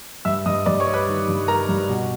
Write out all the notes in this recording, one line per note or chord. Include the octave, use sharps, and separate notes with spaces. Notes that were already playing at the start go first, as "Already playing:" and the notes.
G2 E5 E6
G2 D#5 D#6
G2 D5 D6
C#5 C#6
G3
B4 B5
D#3
G2
G3 A#4 A#5
G2
B2